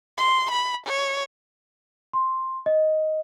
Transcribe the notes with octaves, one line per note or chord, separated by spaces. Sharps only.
C6
B5
C#5
C6
D#5